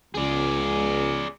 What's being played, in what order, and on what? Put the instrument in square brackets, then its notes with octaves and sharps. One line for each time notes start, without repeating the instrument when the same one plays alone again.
[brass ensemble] C#2 [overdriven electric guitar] G#4 D5